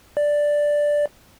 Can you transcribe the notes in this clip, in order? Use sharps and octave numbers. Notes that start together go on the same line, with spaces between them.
D5